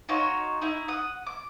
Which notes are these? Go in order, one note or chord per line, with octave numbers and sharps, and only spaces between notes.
D#4 F4 F#4 C#5
D#4 E4
F#5 D#6
D6